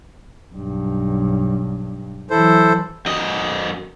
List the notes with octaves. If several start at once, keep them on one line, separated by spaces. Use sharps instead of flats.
B1 G2
E3 F#3 E4 A4 C5
F#2 D#5